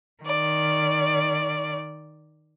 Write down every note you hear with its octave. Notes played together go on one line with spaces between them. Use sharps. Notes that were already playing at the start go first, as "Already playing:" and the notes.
D#3 D5